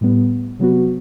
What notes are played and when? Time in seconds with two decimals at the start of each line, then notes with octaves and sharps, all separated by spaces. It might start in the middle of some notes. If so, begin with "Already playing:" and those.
0.01 A2 G3 B3
0.59 C3 F#3 B3 F#4